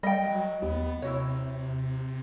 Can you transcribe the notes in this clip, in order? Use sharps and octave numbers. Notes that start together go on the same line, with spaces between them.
G3 D#5 G5
F#3
D#2 B3
C3 E4 F#4 C#5